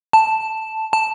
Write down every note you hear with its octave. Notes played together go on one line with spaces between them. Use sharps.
A5
A5